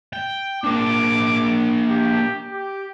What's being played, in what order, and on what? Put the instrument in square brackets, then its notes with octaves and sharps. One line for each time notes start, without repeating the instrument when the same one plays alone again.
[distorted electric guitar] G5
[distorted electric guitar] A#3 D4 [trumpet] D6
[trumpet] G4
G4